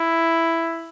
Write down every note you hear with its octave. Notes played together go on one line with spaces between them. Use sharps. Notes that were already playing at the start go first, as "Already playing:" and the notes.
Already playing: E4